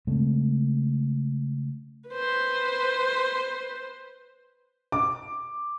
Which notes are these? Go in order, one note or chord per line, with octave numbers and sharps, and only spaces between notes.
C#3 G#3 A3 C4
B4 C5
D6